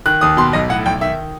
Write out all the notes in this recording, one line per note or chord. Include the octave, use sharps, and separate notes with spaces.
D#3 F#6
D#2 D#6
B2 C6
B1 D#5
A2 F#5
B1 G5
D#3 E5